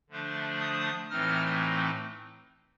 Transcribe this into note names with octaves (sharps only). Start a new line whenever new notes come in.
D3 F3 A3 D4
D#6
A2 E3 A3 C4 D#4 F6